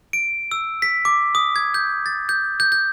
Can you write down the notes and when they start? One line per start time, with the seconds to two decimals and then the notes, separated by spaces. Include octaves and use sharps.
0.13 D7
0.51 E6
0.82 B6
1.05 D6
1.35 D#6
1.56 G#6
1.74 G6
2.06 A6
2.29 G6
2.60 G6
2.72 G6